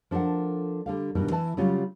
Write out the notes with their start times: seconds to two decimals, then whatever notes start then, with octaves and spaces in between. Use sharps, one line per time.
0.11 F3 D4 A4 A#4 F#5
0.86 D3 G3 F5
1.15 G2 B2 D#3 E3 G3
1.31 E3 E4 A5
1.57 C#3 F#3 G3 C#4 F4